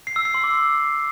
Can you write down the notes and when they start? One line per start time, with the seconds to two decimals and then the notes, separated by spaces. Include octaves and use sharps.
0.07 C7
0.16 E6
0.25 C7
0.34 C6
0.44 D6